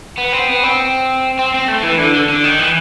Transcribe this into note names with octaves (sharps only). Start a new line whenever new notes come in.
B3
C4
B3
C4
C4
C4
A3
E3
D3
D3
D3
D#3
E3